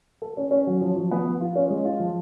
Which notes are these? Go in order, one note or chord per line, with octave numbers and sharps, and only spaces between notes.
A4
C#4
C#4
F#3
F3
F3
B3
F3
F4
C#4
G#3
F4
F3